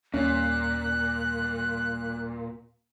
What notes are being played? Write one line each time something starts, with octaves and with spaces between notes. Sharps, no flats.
D#2 A#2 G3 C#4 F#6